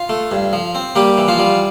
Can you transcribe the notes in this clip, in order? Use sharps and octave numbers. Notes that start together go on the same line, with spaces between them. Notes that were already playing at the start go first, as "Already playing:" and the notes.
Already playing: F4 F5
A3
G2
F3
C4
G3 A#3 G4
E3
F3 F4
G3